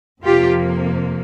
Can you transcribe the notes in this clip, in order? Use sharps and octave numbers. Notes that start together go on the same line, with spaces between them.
F2 C3 F3 A#3 F4 G4